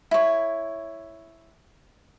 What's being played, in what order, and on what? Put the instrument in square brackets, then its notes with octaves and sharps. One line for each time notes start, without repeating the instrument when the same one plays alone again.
[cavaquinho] E4 C#5